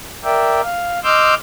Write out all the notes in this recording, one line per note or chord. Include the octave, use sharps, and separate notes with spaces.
A#4 D5 E5 G5
F5
D#5 C6 D6 E6 F6 G6